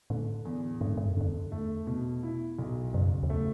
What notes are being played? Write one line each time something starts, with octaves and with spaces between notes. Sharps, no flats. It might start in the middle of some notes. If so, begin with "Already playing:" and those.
A2 D3
E2
G#2 D3
G#2
F#2
F#2 D3
E2
A3
B2
E4
B1
F#1 F#2
E2
E2
A3